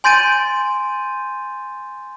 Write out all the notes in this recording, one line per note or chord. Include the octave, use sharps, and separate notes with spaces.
G#5 C6 G6 A6 D7 D#7